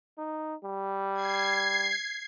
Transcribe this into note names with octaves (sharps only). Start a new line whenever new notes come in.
D#4
G3
G#6 C7